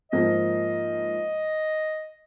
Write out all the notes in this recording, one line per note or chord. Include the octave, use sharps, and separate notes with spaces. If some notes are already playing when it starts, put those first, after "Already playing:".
G#2 F3 A#3 D#5